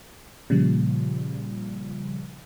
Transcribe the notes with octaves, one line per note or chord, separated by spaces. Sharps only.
A#2 C#3 F3 G3